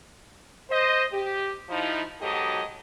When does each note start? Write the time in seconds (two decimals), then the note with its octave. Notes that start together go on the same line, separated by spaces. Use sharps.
0.70 C5 D#5
1.13 G4
1.69 F3 D#4 E4
2.20 G#2 B2 F#3 G4 A4 D#5